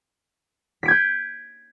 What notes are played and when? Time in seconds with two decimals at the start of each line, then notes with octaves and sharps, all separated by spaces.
0.83 B6
0.86 D7
0.88 G#6
0.91 G6